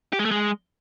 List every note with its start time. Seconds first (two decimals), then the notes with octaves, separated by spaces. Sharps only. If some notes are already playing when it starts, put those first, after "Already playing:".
0.13 G4
0.19 G#3
0.25 A3
0.31 G#3